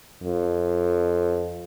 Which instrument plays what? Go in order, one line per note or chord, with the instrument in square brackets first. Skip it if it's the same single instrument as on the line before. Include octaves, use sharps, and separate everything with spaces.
[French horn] F2